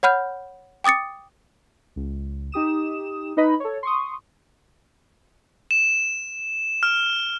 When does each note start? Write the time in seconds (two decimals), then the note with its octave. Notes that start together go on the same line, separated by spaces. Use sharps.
0.03 C#5 F#5 B5 F6 G6
0.84 G5 D6 D#6 A6 C#7
1.96 C#2
2.52 D#4 G4 D#6 E7
3.37 D#4 B4 D#5 B5
3.60 A4 C#5
3.83 C6 C#6 D#6
5.71 E7
6.83 F6